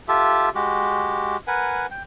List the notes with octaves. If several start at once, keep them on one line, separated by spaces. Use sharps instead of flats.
F4 G4 A4 E5
G#3 F#4 G4
A#4 B4 F#5 G#5
G5